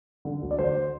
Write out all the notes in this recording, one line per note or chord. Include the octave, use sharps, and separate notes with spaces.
D3
D2
D5
D3 C5